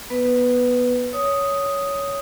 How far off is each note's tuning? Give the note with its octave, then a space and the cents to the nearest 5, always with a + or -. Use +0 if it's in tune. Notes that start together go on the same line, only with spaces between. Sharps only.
B3 -10 B4 +5
C#5 +10 D#6 +0